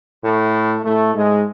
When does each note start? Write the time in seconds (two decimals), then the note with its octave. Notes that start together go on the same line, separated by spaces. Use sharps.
0.24 A2 A3
0.84 A2 A3
1.14 G#2 G#3